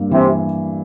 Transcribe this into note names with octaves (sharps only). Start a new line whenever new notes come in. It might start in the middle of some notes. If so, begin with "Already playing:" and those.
Already playing: G2 A#3
C3 E3